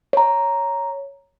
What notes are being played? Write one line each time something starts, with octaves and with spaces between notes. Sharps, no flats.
C#5 A#5